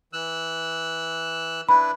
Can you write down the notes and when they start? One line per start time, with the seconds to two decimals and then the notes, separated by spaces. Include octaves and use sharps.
0.13 E3 E6 F#6
1.69 D4 E4 B4 B5